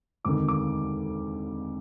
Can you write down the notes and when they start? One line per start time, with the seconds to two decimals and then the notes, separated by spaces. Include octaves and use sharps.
0.24 E1 D2 C3 D#3 D6
0.48 D6